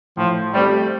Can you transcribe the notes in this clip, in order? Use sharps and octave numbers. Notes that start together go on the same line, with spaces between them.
A2 F3
G3 A3 C4 G4